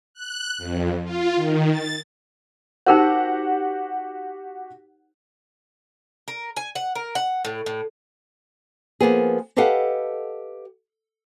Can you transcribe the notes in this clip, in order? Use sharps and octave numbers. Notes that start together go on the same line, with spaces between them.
F#6
F2
F4
D#3
A6
D#4 F#4 G4 A#4 C5 F#5
A#4
G#5
F#5
A#4
F#5
A2
A2
F3 A#3 B3 G#4
G4 A4 B4 D#5 F5 F#5